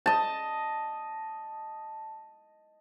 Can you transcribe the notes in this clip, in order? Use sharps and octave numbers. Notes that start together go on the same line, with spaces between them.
D#5 A5